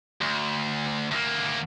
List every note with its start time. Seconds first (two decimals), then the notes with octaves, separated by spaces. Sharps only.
0.21 D2
1.11 D2 A#3